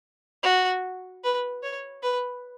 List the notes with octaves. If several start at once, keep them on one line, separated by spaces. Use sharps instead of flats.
F#4
B4
C#5
B4